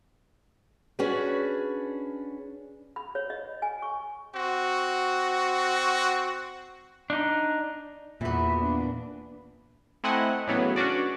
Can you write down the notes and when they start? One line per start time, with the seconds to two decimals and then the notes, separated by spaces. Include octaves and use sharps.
0.99 C#4 D4 F#4 G#4 B4
2.96 B5
3.15 C#5
3.30 D#5
3.62 G#5
3.82 C#6
4.35 C4 F#4
7.10 D4 D#4
8.21 E2 A#2 E3 B3 F#4 E5
8.59 A#3 D4
10.04 A3 C4 E4 D#5 F#5 G#5
10.47 A2 C#3 E3 F#3 B3
10.76 C#4 D4 F#4 D5